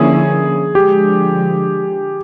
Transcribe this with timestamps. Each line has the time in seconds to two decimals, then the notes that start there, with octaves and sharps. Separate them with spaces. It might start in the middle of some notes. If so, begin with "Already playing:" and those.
Already playing: D3 F3 A#3 C#4 E4 G#4
0.75 D3 F3 G#3 G4